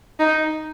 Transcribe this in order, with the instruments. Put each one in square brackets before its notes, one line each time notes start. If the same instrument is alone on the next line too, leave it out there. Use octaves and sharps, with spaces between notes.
[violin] D#4